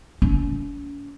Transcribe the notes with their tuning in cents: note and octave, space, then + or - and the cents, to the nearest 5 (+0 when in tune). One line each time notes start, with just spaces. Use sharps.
C#4 +40